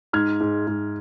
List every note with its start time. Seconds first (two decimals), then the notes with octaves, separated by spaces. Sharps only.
0.13 G#2 F6 G#6
0.40 G#2
0.67 G#2